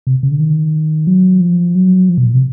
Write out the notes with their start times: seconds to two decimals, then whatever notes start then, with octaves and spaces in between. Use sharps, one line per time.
0.07 C3
0.23 C#3
0.32 D3
0.40 D#3
1.07 F#3
1.41 F3
1.75 F#3
2.09 F3
2.18 B2
2.25 A#2
2.34 C3